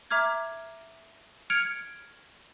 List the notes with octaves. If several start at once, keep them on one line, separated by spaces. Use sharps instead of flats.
E5 A#5 D6 F6 G#6
F6 G#6 C#7 D7 F7